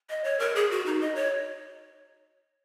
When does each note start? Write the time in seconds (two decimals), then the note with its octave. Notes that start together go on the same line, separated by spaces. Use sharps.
0.10 D#5
0.24 C#5
0.39 A#4
0.56 G#4
0.71 F#4
0.86 D#4
1.01 D#5
1.15 C#5